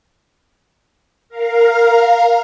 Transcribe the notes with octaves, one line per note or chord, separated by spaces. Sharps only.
A#4 F5